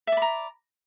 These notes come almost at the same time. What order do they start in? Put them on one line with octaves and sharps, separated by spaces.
E5 D5 B5 A#5